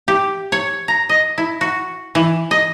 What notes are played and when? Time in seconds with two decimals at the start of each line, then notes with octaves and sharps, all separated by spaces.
0.08 G4
0.52 C#5
0.88 A#5
1.09 D#5
1.38 E4
1.61 F#4
2.15 E3
2.51 D#5